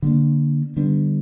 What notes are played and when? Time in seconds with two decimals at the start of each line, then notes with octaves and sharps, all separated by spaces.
0.02 D3 G3 A#3 D4
0.77 D3 G3 B3 D4